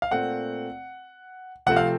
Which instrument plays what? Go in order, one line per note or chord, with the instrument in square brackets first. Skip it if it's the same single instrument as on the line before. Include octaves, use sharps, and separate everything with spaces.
[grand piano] F5
A#2 A3 C4 F#5
C3 F3 A3 C4 F#5
F5